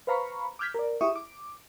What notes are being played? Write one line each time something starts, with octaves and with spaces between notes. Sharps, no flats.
B4 C5 F5 A#5 B5 C#6
D6 E6 F6 G6 G#6 B6
A#4 D5
E4 G4 G#4 E5 C#6 D#6
D6